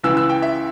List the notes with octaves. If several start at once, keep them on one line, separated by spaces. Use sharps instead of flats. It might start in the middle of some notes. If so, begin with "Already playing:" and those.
C#2 C#3 E3 E6
E6
G5
E5